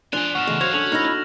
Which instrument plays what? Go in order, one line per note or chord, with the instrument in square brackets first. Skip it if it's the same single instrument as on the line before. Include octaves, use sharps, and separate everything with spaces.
[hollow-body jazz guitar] F3 D4 [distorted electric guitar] D5 G#5 [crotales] F#6 F7 G7
[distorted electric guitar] D#2 B2 [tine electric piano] F#5 [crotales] C#6 F6 E7
[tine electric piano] C#3 E3 A3 [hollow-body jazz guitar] G#3
[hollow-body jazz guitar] F#3 [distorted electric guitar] F#4 F5 [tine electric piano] C5 [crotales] C#6 G#6 F7
[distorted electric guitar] C#4 [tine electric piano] D4 F#4 A4 [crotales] F#7
[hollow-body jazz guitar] D#4 E4 [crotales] F6 A#6